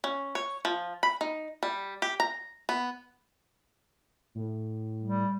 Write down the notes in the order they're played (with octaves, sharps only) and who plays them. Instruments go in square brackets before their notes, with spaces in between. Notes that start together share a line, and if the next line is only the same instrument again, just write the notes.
[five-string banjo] C#4
C#5
F3
B5
D#4
G3
G4
A#5
B3
[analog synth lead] A2
[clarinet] G3